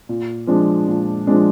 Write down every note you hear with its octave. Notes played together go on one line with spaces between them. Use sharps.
A#2
F3 G#3 D4
A#2
F3 G#3 D4